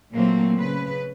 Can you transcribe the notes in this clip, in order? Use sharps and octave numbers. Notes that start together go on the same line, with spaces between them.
A#2 F#3 A3 A#3 C4
C#3 B4